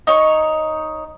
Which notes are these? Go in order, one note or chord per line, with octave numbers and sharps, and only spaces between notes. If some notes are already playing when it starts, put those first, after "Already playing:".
D#4 C#5 C#6